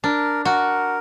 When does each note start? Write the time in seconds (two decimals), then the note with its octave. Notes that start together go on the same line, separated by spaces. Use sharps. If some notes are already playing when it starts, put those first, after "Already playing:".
0.04 D4 A#4
0.45 F#4 A#4